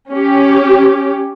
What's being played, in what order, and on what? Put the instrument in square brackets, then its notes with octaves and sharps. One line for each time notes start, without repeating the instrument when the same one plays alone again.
[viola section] C#4 G4